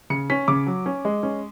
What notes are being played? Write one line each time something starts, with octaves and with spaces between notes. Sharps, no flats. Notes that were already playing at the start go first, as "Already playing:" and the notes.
C#3 C#7
C#4 B6
C#3 D6
F#3
C#4
G#3
C#4